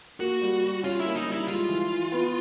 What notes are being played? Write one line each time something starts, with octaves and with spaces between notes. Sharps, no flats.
A#3 F#4
G3
G3
C#4 F4
E4
A#3
D#4
G3
E4
G#3 F4
E3
E3
B3